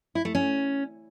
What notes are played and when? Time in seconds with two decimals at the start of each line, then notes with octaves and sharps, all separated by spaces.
0.15 E4
0.25 A3
0.35 C#4